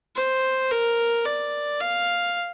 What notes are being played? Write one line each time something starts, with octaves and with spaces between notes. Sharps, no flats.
C5
A#4
D5
F5